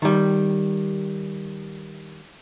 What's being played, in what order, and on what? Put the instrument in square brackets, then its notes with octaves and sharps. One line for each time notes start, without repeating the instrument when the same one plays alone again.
[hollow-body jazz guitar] D#3 G3